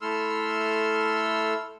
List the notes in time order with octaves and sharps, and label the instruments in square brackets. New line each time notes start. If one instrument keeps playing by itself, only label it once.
[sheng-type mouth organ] A3 E4 A4 C6 E6 F6